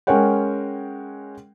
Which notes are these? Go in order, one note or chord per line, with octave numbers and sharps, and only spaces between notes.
G#3 C#4 A#4 C#5 F#5 G5